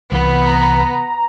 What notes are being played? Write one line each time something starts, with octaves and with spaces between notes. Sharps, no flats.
C2 E3 B3
A#5